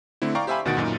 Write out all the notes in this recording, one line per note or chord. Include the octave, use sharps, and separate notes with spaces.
D3 A3 C4 E4
D5 F5 G5 A#5 C#6
G4 C5 E5 F5 G#5 B5
D2 B2 D#3 F#5 A6 D7
F#2 A#2 D#4